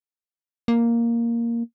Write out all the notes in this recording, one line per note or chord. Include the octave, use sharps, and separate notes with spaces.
A#3